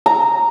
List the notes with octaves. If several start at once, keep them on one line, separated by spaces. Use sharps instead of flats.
A#5